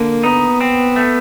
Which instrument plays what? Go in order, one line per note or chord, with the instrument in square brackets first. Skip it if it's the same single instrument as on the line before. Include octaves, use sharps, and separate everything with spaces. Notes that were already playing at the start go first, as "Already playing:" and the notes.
Already playing: [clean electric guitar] D3 [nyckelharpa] A#3
[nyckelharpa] B3 [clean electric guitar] D#4
[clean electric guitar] C4
A3